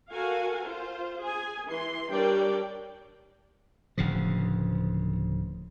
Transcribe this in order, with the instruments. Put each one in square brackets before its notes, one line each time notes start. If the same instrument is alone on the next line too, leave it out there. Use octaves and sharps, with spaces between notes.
[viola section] F#4 A4 A#4 F5 F#5 G#5
F4 C5
G#4 G#5
E3 C6
G3 D4 A#4 C#5 D5 G5
[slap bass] D1 D2 C#3 F3